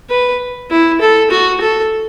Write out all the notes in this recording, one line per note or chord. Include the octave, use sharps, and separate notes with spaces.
B4
E4
A4
F#4
A4